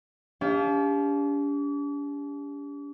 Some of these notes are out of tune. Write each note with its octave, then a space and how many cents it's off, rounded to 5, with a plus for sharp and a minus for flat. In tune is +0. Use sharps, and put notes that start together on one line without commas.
D4 -45 G4 +30 F5 +0